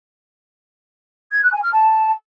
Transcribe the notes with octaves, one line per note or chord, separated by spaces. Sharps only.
G#6
F#6
G#5
F6
A5